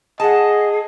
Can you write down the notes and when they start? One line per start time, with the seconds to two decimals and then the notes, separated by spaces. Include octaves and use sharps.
0.20 G#4 D#5 F#5 A5